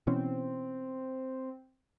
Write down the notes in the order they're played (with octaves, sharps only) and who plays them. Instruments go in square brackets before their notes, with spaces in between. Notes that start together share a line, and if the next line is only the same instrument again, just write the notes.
[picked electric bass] B2 E3 C#4 [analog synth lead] C4